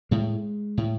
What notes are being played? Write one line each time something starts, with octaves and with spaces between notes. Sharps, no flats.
A2 G#3
A2